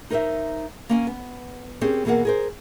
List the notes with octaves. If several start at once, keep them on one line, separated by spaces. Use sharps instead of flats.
D#4 A#4 C5 D#5 E5
A#3 C#4 G#5
B3
C4 C#4 G4 G#4 A#4 C#5
B2 E3 A#3 G#4 A#4 F#5
G#4 A#4 C5